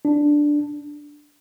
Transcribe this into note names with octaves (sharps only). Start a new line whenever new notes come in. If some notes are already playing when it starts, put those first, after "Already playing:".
D4